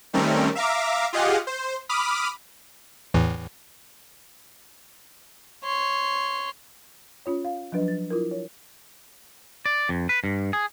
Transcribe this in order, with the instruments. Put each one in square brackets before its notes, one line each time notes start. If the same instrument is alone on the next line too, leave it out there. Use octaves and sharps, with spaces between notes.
[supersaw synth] D#3 G3 A3 C4 C#4 A#4
E5 F5 A#5 D6
F4 G4 G#4 D#5 F5 F#5
C5
B5 D6 D#6 F6
[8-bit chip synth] E2 A2 E3
[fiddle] C#5 C6
[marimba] C#4 F4 C#5
F5
F3 F#3 D4 B4 D#5
A6
E4 F4 A#4
C#5
[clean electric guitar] D5
F2
B4
G2
G#4